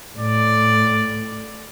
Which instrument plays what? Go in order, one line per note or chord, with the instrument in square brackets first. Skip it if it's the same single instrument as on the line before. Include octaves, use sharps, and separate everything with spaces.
[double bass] A2 [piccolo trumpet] D5